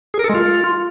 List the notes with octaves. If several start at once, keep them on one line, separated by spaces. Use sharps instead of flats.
G#4
A#4
A4
G#3
F4